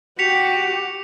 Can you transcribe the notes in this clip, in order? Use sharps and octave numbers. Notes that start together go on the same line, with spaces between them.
F#4 G4 B6 C#7 F7